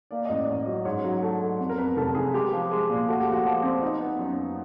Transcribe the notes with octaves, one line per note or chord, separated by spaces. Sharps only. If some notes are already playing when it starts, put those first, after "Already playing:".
A#3 D5
A1 D#5
D5
A1
F#3
G#2 C#5
F#3
A3
A3
F2
A#4
F2 B4
F1 A4
F1 G#4
G#3 G4
F3
G#3
A#2
A3 F#4
G4
F3 F#4
F3
C4
B3 D#4
B3
F#2
F#2